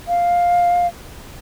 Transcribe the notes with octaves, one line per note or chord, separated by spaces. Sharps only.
F5